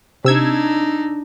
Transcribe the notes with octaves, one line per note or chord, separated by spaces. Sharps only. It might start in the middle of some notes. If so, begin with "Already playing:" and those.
C3 D4 D#4 E6 G#6